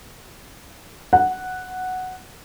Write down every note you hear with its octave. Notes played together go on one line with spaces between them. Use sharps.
F#5